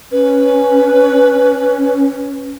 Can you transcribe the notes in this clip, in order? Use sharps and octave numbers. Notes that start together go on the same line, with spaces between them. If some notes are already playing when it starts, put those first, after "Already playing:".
C#4 B4